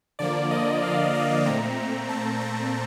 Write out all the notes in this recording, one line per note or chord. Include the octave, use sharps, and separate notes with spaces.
D3 F3 A#3 D5
D#5
F5
D#5
A#2 A3 C4 A#5
A5
A5